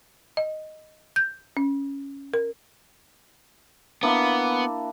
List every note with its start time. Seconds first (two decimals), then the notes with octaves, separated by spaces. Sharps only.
0.37 D#5
1.16 G6
1.57 C#4
2.34 A#4
4.03 A#3 B3 D4 E4